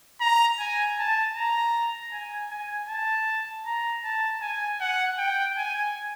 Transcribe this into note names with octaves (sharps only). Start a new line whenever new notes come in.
A#5
G#5
A5
A#5
G#5
G#5
A5
A#5
A5
G#5
F#5
G5
G#5